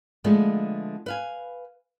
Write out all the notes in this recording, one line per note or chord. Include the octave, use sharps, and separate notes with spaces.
D3 F3 G#3 A3 B3 A4
B4 F5 G#5